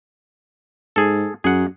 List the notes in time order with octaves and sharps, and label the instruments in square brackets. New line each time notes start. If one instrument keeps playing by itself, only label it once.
[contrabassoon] G#2 [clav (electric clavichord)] G#4 A4
[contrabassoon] F#2 [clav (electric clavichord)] G#4 F#5